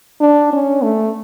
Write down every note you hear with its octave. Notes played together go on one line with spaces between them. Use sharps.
D4
C#4
A3